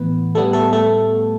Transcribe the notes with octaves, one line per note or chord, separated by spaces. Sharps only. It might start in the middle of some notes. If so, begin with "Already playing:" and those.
Already playing: A2 E3 B3 B4
A2 G3 A3 B3 A4
A3 A4
A3 A4